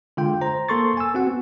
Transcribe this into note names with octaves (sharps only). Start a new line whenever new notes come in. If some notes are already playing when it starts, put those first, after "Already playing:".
D3 G#3 F4 G5
C5 A#5
A#3 A4 C6 C#6 A6
G#5 E6
C4 F#4 F#5
B3